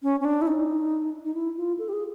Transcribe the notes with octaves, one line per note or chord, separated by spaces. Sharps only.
C#4
C#4
D4
E4
D#4
D#4
E4
F4
A4
G4
G#4